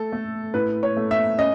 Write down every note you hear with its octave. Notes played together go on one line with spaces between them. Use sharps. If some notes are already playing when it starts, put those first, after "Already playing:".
Already playing: A3 A4
A3
A2 B4
C#5
A3
E5
C#4 D#5